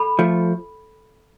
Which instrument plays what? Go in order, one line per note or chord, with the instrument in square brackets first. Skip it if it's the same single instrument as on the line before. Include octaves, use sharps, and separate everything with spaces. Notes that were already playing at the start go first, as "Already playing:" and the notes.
Already playing: [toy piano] A4 B5
[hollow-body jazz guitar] F3 A3